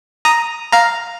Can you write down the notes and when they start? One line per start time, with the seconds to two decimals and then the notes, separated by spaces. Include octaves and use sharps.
0.25 A#5 D#6
0.72 F5 A#5